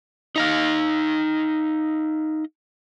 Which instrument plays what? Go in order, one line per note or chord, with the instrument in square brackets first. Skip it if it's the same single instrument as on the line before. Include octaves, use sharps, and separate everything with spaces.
[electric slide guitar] D#4 D#5 F5